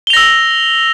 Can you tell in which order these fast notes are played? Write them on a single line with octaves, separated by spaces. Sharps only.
G7 F7 A#6 E6